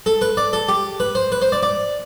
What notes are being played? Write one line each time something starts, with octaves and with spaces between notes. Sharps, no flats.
A4
B4
D5
A4
G4
B4
C5
B4
C5
D5
D5